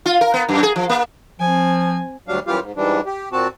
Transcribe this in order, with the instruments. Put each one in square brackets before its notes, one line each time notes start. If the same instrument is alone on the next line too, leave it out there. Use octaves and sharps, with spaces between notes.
[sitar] F4
A#4
B3
F#2
G#4
F3
A#3
[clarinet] F3 [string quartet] C4 G#5
[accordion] D2 F#3 G3 D4 F5
F#2 E3 G3 F4 G4 F5
G#2
G#2 E3 G3 D4
G4
A#2 C4 F#4 A5